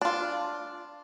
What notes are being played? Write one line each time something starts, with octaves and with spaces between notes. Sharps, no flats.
D4 F4